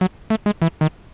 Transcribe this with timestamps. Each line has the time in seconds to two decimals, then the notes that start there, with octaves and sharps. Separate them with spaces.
0.01 F#3
0.30 A3
0.46 G#3
0.62 E3
0.81 D#3